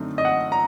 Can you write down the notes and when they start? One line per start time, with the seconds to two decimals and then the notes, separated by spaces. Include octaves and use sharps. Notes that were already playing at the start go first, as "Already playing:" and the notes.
Already playing: F#2 D3 A3 C4 D#4
0.18 D#5
0.25 F#5
0.52 A#5